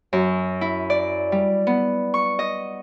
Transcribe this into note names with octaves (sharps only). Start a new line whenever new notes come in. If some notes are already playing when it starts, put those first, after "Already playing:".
F#2
E4
D5
G3
B3
C#6
D#5